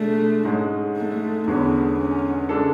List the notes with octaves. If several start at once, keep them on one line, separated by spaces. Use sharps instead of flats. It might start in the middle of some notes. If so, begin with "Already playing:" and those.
Already playing: B2 G#3 A3 D4 G#4
G#2 G#3 C#4
A3
E2 D3 G#3 B3 C#4
C#4
C#3 G#3 D4 A4